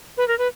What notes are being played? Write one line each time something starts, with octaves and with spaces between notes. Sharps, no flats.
B4
A#4
B4